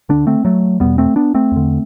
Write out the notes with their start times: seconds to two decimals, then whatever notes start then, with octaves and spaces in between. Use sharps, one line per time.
0.09 D3 B3 D4
0.13 D2
0.27 A3 C4
0.45 F#3 A3
0.80 E2 B2 G3 B3
0.98 A3 C4
1.16 B3 D4
1.34 A3 C4
1.52 E2 D3